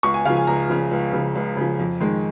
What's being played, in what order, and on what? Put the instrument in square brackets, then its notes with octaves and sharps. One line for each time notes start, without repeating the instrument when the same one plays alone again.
[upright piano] C#2 C#6
G#5
C#3 F3 F5
G#5
C#2 A#5
C#3 F3
C#2
C#3 F3
C#2
C#3 F3
F2
D#3 G#3